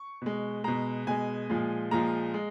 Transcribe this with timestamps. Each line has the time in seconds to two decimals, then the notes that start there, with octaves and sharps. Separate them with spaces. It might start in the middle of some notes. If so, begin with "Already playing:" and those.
Already playing: C#6
0.22 B2 G#3
0.64 B2 G#3 A#5
1.07 B2 G#3 G#5
1.50 A#2 F3 G#3
1.91 A#2 F3 G#3 A#5
2.34 G#3